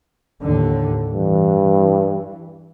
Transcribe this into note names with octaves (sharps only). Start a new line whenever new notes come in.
D#2 A2 D3
G2 E3